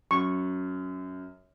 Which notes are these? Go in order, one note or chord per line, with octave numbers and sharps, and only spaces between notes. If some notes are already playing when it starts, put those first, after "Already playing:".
F#2 C#6